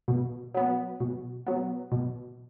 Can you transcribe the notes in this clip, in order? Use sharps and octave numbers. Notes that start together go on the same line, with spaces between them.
B2
F#3 B3
B2
F#3 B3
B2